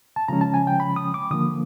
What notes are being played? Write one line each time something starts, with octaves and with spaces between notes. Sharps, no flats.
A5
C#3 F3 G#3 C#4 A#5
A5
G#5
G5
B5
D#6
D6
D3 F3 A#3 D#6